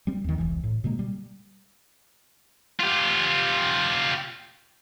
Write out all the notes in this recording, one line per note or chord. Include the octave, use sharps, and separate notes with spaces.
G3 C4
D#2 D#3
E1 C2 E3
A2
B2 D3 G#3 A#3
G3
F4 G4